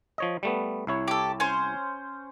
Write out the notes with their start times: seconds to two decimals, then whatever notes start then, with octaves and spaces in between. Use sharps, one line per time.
0.18 F3 C#5 D#5
0.43 G3 A3 B3
0.87 C2 E4 C#5
1.08 G4 A4
1.40 C#4 C5